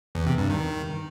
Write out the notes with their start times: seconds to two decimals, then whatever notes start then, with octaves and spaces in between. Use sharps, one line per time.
0.15 E2
0.27 C3
0.38 G2
0.50 D#3